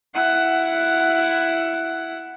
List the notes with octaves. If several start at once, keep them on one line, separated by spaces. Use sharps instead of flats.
E4 F#5